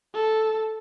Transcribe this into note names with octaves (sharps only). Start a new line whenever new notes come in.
A4